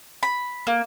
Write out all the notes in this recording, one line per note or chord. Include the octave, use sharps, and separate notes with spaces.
B5
A#3